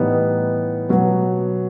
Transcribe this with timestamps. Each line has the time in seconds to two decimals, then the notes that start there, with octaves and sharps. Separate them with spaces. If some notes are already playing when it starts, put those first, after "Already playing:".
Already playing: A2 E3 G3 B3 D#4
0.89 B2 F#3 B3